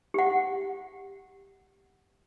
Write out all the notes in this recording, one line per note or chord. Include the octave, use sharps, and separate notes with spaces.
G4 F#5